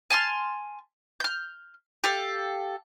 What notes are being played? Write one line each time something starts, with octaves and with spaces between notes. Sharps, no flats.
G#5 A5 C6 F6
F6 G6
G4 A4 F5